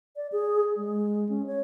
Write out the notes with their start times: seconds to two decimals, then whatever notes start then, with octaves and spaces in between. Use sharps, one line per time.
0.16 D5
0.32 G#4
0.77 G#3
1.29 C#4
1.47 C#5